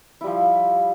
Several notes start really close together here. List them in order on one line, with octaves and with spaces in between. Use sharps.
E4 G3 F3